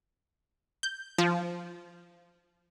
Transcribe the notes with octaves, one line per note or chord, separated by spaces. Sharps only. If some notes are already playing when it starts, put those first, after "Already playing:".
G6
F3